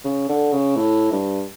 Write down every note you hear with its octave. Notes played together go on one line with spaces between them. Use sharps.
C#3
D3
C#3
A2
G2